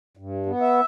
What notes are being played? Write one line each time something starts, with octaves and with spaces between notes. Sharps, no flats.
G2
B3
E5